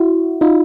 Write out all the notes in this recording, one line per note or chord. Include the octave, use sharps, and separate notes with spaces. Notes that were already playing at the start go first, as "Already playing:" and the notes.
Already playing: E4 F#4
D#4 F4